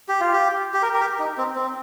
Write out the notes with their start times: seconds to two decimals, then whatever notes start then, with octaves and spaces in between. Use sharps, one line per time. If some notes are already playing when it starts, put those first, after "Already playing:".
0.09 G4
0.20 F4
0.33 G4
0.74 G4
0.83 A#4
0.94 A#4
1.01 G4
1.19 D#4
1.38 C4
1.56 C4